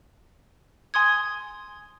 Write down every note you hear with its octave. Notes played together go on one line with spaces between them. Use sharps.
G#5 C6 D#6 G#6